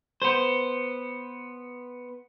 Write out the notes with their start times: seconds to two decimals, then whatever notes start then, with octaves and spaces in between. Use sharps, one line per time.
0.22 B3 C5